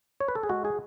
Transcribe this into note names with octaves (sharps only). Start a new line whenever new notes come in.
C#5
B4
A4
G#4
G#3 F#4
G#4